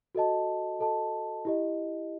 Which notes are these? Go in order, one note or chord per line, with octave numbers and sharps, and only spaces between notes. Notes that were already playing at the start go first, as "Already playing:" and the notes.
F#4 A4 D#5 A5
F#4 A4 D#5 A5
E4 G4 D#5